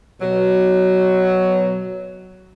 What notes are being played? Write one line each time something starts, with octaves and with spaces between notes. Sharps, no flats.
B2 F#3